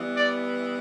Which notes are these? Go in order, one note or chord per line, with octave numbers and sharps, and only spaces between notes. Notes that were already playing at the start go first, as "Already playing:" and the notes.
Already playing: E3 G3 B3
D5